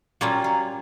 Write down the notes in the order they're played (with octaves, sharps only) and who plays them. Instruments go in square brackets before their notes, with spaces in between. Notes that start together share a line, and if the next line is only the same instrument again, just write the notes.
[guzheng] A#2 G3 A#3 C#4 F4 [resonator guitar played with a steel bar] F#3
[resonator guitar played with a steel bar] F#3